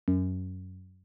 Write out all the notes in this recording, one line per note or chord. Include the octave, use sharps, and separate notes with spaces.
F#2